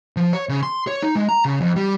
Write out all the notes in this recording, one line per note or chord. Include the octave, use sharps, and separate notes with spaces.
F3
C#5
C#3
C6
C#5
D#4
G#3
A#5
C#3
F2
G3